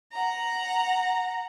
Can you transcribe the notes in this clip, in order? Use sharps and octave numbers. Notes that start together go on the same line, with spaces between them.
F#5 A#5